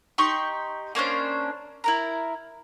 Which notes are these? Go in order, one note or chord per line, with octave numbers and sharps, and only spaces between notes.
D#4 G4 C6 C#6
A#3 C#4 D4 C5
E4 A#4 A#5